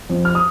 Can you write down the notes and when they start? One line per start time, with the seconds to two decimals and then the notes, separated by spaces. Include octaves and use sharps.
0.09 F2
0.25 F6
0.35 D#6